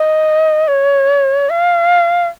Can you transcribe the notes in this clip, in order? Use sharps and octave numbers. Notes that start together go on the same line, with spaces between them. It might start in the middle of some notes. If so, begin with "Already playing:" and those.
Already playing: D#5
C#5
F5